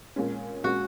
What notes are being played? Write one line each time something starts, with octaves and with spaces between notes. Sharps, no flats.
A#2 G#3 C#4
A#2 G#3 C#4 F#4